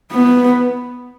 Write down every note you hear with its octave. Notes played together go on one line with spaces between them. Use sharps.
B3